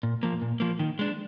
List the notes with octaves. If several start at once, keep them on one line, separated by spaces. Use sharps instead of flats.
A#2
F3 A#3
A#2
F3 A#3
D#3
G#3 D4